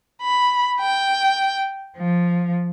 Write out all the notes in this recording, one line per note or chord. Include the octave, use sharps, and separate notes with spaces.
B5
G5
F3